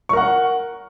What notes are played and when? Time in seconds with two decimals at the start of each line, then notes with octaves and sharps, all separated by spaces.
0.09 C#6
0.13 A#4
0.17 F#5